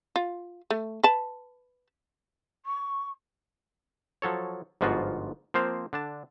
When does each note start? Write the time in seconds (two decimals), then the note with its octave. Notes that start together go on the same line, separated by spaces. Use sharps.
0.16 F4
0.70 A3
1.03 B4 A5
2.66 C#6
4.22 F3 F#3 A4 C#5
4.81 G1 G#2 F3 B3 F4 F#4
5.54 F3 A#3 C4 C5 F5
5.93 D3 D4 A5